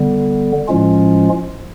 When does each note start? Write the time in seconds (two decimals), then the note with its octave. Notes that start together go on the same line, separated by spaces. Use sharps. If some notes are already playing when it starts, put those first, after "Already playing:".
Already playing: D3 G3 B3
0.68 A2 F3 G#3 C#4 F4